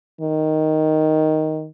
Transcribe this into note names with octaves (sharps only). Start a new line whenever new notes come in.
D#3